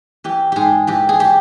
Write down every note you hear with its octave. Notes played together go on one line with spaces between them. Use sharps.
E3 G4
G#2 G4 G#4
E3 G4
G#4
G4